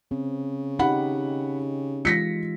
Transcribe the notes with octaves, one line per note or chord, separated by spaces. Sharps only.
C#3 C4
D#4 G4 F#5 B5
E3 G#3 F4 A#6 B6 C#7